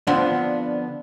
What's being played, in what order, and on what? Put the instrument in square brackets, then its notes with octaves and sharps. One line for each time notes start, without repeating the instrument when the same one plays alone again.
[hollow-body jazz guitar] D3 F3 B3 C4 D4